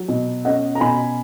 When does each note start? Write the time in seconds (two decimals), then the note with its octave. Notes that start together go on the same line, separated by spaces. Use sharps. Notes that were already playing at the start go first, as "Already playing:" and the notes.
Already playing: F#3
0.08 B2
0.45 C#4 D#5 F#5
0.75 A#5
0.80 B2 G#5 B5